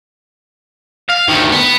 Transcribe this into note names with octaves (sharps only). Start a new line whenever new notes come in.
F5
D2 D#3
B3